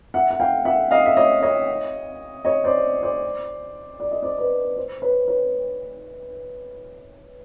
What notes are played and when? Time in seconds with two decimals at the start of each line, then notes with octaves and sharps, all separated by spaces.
0.14 E5 F#5
0.30 F#5
0.40 F5 G5
0.65 E5 F#5
0.91 D#5 F5
1.06 E5
1.17 C#5 D#5
1.42 C#5 D#5
2.45 C#5 D#5
2.64 C5 D5
3.03 C5 D5
4.00 D5
4.11 D#5
4.22 C5 D5
4.38 B4
4.76 C5
5.02 B4 C#5
5.28 B4 C#5